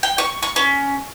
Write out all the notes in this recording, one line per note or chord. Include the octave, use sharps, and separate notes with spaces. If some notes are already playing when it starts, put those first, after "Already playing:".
G5
C#6
C#6
C#4